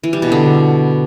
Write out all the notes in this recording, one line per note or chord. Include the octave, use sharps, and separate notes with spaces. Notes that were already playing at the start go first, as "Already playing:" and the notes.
E3
G3
B2
D3